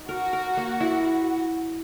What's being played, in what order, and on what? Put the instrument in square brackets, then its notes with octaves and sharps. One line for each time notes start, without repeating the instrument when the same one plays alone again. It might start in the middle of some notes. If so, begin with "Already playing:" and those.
Already playing: [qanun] D#4
[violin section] F#4 [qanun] A#4
[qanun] A#4
A#3
E4